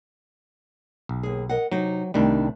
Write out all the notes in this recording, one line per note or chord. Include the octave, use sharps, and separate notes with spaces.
B1
D#2 G#4
A#4 D#5 F#5
C3 F#3 D#4
C2 D#3 G3 A3 D4